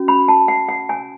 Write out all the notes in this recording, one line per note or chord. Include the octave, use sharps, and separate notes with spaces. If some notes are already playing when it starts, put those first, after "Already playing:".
Already playing: C#4 F#4
B5
A5
F#5
F#5
G#5